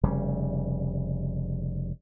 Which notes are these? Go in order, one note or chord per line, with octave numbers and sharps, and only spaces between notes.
F1 C#3 G3